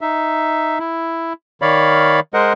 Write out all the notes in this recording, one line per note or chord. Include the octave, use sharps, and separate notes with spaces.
D#4 E5
E4
D#3 C#5 D5 F5 B5
G#3 A#4 C5 D#5 F#5